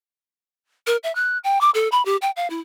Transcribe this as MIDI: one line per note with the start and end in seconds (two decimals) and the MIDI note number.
0.87 0.97 70
1.03 1.14 76
1.15 1.38 90
1.44 1.60 79
1.61 1.70 86
1.74 1.88 69
1.92 2.04 83
2.05 2.17 67
2.22 2.31 79
2.36 2.48 77
2.50 2.60 64